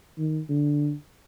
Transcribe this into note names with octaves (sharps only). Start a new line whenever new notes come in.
D#3
D3